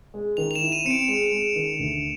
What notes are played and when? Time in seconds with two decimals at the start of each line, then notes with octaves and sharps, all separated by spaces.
0.14 G#3
0.37 D#3 F7
0.51 F7
0.55 E7
0.62 E4
0.72 D#7
0.85 C4 C#7
0.91 D7
1.08 G#3 D#7
1.32 G#3
1.56 D#3
1.79 D2